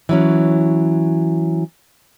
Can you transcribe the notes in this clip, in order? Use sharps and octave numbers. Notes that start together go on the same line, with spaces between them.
E3 F#3 C#4